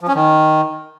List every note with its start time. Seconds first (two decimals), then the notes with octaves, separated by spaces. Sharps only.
0.01 F3
0.08 C#4
0.15 D#3